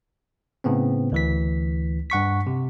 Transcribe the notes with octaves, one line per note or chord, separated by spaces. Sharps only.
A2 C#3 B3 C4
D2 E3 B6
G2 F#5 C#6 B6
C3